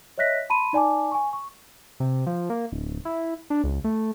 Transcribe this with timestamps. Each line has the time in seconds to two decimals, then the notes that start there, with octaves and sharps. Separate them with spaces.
0.18 C#5 D#5 E5 F#6 A#6 B6
0.50 A5 B5 C6 D#7
0.73 D#4 D5 G#5 A5 D6
1.11 G#5 C#6
1.33 C#6
2.00 C3
2.27 F3
2.50 A#3
2.72 D1
3.05 E4
3.50 D4
3.64 C#2
3.84 A3